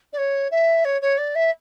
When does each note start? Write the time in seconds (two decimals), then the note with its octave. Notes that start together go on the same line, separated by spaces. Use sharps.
0.12 D5
0.17 C#5
0.51 E5
0.84 C#5
1.01 C#5
1.17 D5
1.35 E5